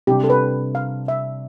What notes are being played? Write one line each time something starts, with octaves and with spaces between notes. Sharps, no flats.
C3 G3 D4 G4
A4
B4
F5
E5